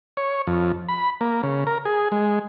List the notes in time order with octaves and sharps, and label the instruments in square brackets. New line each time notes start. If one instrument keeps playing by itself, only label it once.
[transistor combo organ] C#5
F2
B5
A#3
C#3
A#4
G#4
G#3